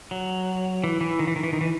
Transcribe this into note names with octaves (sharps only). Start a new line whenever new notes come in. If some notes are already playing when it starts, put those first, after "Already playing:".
F#3
E3
E3
D#3
E3
D#3
E3
D#3
E3